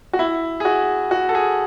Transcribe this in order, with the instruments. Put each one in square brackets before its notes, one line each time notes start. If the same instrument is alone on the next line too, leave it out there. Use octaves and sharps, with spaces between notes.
[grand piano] F#4
E4
G#4
F#4
F#4
A4
G#4